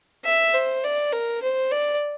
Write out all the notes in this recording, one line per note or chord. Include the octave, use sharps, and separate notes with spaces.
E5
C5
D5
A#4
C5
D5